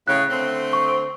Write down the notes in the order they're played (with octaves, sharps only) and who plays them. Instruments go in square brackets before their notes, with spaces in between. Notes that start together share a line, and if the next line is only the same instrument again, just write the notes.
[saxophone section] A2 C#3 [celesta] F#6
[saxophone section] D3 A3 C4
[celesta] C#6